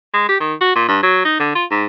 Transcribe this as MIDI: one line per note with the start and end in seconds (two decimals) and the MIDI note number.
0.14 0.27 56
0.29 0.37 67
0.41 0.54 51
0.61 0.76 66
0.76 0.87 46
0.88 0.99 43
1.03 1.22 54
1.25 1.38 63
1.40 1.50 50
1.55 1.65 65
1.71 1.86 44